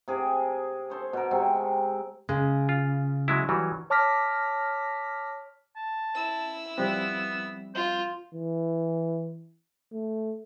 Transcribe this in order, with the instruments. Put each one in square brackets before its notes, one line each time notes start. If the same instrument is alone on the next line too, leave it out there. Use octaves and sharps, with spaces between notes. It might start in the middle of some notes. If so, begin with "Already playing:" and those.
[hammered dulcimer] C3 G#4 D6
A4 C5 C#5
B2 A#4
C3 G#3 C4 C#6
[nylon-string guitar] C#3 [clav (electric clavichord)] G#3
[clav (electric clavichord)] F4
F#3 G#3 E4
E3 F#3 G3
[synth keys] C#5 A5 D6 F6 A#6 B6
[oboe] A5
[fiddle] E4 E6
[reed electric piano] F3 G3 C4 [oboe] B3
[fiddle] F4 [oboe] C5
[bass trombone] E3
A3